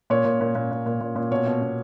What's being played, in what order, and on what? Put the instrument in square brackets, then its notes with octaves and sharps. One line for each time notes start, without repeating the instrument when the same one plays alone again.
[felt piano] A#2 C#5
A#2
A#2
A#2
A#2
A#2
A#2
A#2
B2 C#5
B2
B2